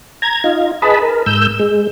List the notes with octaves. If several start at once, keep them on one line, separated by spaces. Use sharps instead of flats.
A#5 G#6
D#4 F4
G#4 B4 D#5 A5 B5
A#4
G#2 E6 G6
G#3